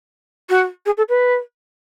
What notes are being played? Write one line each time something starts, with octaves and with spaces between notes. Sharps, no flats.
F#4
G#4
A4
B4